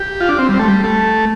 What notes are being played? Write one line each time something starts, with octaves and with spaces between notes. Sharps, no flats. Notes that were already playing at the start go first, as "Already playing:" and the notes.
Already playing: G4
F4
D4
C4
G3
C4
A3
G3
A3